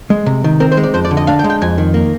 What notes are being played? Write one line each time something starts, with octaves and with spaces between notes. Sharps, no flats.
G#3
C3
D#3
C4 A#4
C5
G#3
D5
F2 C5
D5
D3
D#5
D4 F5
G5
G#3
G5
F2 G#5
D#3
A#3